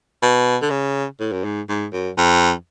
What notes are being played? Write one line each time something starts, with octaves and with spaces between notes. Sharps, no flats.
B2
D3
C#3
A2
F#2
G#2
G#2
F#2
F2